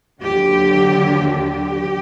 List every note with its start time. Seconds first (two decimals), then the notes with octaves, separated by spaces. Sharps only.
0.22 D#2 D3 F#3 G4
1.33 G4